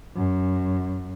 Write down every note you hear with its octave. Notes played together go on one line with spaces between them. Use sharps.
F#2